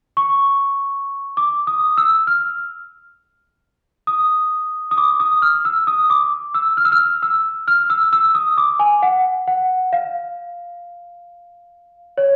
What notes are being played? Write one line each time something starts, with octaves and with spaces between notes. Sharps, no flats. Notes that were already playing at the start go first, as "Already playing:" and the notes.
C#6
D6
D#6
E6
F6
D#6
D#6
D6
D#6
F6
E6
D#6
D6
E6
F6
E6
F6
E6
F6
E6
E6
D#6
D6
G#5
F#5
F#5
F5
C#5